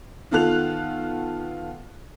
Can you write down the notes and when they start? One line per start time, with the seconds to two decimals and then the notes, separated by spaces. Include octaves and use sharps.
0.31 D#3 B3 F4 A4 F#6 F7